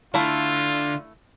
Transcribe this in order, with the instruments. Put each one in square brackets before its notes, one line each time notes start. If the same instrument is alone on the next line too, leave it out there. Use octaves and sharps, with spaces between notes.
[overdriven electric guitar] D3 [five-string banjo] A3 E4 F5 [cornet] F4